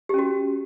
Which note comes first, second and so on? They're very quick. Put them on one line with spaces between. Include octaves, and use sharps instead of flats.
G4 C#4 F#4